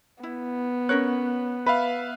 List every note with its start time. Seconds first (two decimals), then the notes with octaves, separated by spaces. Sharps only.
0.23 B3 E4
0.89 C#4 A#4 C#5 F#6
1.66 B4 E5 F5 B5